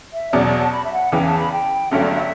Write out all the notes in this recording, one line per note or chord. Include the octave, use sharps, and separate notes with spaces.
E5
E2 B2 F#3 D5
D5
A5
B5
E5
F#5
E2 C#3 E3 G5
A5
B5
G5
G1 G2 F#3 A3 E5
D5
E5